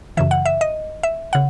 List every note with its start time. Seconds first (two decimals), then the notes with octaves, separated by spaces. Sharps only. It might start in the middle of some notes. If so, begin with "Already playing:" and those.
0.17 F#2 C#3 E3 E5
0.31 F#5
0.45 E5
0.61 D#5
1.03 E5
1.33 C#3 F#5